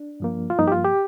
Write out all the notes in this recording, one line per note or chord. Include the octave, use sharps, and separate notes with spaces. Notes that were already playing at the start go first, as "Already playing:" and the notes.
Already playing: D4
G2 F3 A#3
F4
G2 F3 A#3 D#4
G4
F4
G4